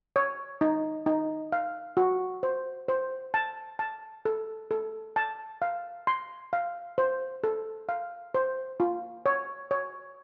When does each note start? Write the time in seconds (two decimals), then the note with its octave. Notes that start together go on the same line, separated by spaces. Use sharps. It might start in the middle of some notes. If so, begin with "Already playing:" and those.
0.16 C#5
0.61 D#4
1.06 D#4
1.52 F5
1.97 F#4
2.43 C5
2.88 C5
3.34 A5
3.79 A5
4.25 A4
4.71 A4
5.16 A5
5.62 F5
6.07 C6
6.53 F5
6.98 C5
7.44 A4
7.89 F5
8.34 C5
8.80 F4
9.26 C#5
9.71 C#5